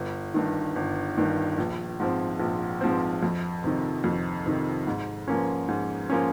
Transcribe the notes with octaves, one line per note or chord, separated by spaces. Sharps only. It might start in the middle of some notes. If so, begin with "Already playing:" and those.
Already playing: G1
G2 D#3
G1
G2 D#3
A#1
G#2 F3 C4
A#1
G#2 F3 C4
F2
C3 D#3
F2
C3 D#3
G#2
F3 A#3 C#4
G#2
F3 A#3 C#4